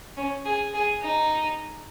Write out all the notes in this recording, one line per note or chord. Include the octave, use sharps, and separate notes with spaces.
C#4
G#4
G#4
D#4